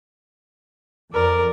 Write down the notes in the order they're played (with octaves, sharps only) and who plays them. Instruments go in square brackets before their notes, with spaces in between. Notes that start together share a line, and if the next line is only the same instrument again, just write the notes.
[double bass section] F2 [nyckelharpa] A#4 D5